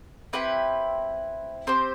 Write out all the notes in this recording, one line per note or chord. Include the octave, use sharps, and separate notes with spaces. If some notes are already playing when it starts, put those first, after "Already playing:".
C4 E4 G4 B4
C4 G4 C5